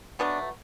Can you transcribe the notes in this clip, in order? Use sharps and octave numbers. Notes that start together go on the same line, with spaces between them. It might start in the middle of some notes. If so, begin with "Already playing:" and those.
B2 F#3 A3 B3 D4